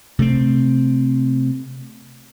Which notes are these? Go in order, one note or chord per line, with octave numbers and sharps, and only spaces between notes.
C3 A3 C4